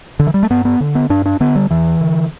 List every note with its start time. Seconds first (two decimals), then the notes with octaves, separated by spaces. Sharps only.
0.19 D3
0.27 E3
0.34 G3
0.43 A3
0.50 G2 B3
0.65 B3
0.81 D3
0.95 B3
1.10 G2 D4
1.26 D4
1.40 D3 B3
1.56 G3
1.70 E2 E3
2.01 D3